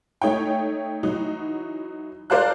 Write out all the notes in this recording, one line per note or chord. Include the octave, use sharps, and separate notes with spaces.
A3 D#4 C#5 G5
E3 F#3 D#4 F#4
A#4 C5 D5 F5 A5 F#6